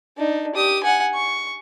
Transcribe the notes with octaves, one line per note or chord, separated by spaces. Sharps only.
D4 D#4
G4 D#6
F#5 G#5
C#6